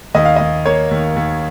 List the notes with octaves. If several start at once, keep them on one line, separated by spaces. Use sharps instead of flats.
D#2 D#5
F5
D#2 D#5
A#3 C#5
D#2
D#2